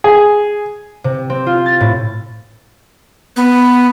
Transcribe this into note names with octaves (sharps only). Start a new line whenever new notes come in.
G#4
C3
C4
F4
A6
A2
B3